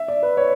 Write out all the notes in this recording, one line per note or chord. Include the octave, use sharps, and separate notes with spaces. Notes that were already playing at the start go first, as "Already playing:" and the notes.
Already playing: E5
D5
B4
C#5